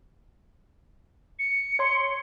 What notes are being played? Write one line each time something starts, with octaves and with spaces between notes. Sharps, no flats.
C#7
C#5 C6